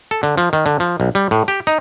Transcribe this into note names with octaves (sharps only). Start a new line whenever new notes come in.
A4
D3
F3
D#3
D3
F3
B1
G3
A2
G4
D#4